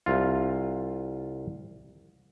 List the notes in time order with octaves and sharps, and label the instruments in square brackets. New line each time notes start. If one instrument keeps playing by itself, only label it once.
[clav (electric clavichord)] C2 F4